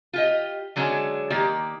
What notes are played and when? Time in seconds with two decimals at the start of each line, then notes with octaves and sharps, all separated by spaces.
0.13 F4 G4 D#5
0.76 D3 F#3 G#3 C#4 D4
1.30 D#3 A#3 G4 D5